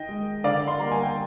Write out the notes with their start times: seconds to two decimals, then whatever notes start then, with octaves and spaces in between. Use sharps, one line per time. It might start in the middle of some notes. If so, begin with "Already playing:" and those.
Already playing: D#3 D#5 G5
0.09 G#3
0.44 D3 D5 F5
0.68 C6
0.79 G3 A#3 A#5
0.92 G#5
1.03 G5